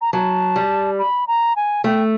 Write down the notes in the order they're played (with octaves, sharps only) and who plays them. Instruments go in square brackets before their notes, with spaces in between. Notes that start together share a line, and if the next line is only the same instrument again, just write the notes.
[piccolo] A#5
[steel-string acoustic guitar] F#3 [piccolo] A5
[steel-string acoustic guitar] G3
[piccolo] B5
A#5
G#5
[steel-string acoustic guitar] A3 [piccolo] G5